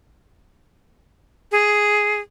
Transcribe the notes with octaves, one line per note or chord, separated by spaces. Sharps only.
G#4